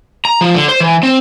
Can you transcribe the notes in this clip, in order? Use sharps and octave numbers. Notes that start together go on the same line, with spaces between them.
A#5
F3
D3
C5
E3
C4